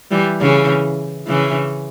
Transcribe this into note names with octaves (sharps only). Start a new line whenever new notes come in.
E3 G3
C#3 E3
C#3 E3